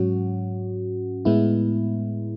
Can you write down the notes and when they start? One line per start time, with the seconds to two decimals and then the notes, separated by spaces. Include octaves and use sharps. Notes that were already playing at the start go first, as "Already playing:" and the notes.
Already playing: G#2 F#3 C#4 F#4
1.25 A2 G#3 B3 E4